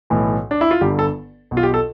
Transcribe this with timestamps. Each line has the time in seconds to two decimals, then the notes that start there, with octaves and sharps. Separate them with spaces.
0.10 B1 A2 E3
0.51 D4
0.61 E4
0.71 F4
0.81 G1 G2 D3 G4
0.99 A4
1.51 B1 B2
1.57 F4
1.63 G4
1.74 A4